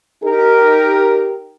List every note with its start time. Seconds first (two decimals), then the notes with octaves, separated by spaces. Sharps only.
0.24 D#4 G4 A#4